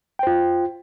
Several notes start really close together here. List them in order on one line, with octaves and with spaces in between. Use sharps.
G5 C5 F4